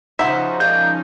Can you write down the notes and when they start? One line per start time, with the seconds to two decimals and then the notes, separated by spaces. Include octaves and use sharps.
0.19 C#3 F3 D#4 F#4 C5 E5
0.60 G#3 A#3 D4 G6